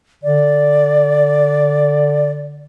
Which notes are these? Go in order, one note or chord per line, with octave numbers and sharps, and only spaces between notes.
D3 D5